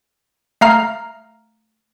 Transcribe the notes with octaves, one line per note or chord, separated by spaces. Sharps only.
A3 F5 A#5 F6